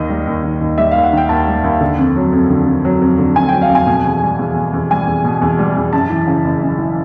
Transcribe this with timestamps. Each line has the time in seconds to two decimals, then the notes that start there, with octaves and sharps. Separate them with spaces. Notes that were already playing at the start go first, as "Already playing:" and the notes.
Already playing: D#2 D#3 D#5
0.09 G3
0.27 D#2
0.43 D#3
0.61 D#2
0.78 G3 E5
0.91 F5
0.95 D#2
1.04 F#5
1.13 D#3 G5
1.29 D#2 A5
1.47 G3
1.64 D#2
1.81 D3
1.98 F2
2.16 F#3
2.32 F2
2.50 D3
2.67 F2
2.85 F#3
3.01 F2
3.19 D3
3.36 F2 G#5
3.49 G5
3.53 F#3
3.62 F5
3.69 F2
3.75 G#5
3.87 B2
4.04 E2
4.22 G3
4.39 E2
4.56 B2
4.73 E2
4.90 G3 G#5
5.07 E2
5.24 B2
5.41 E2
5.59 G3
5.76 E2
5.93 F#2 A5
6.10 E3
6.27 C#3
6.44 F#1
6.62 F#2
6.78 E3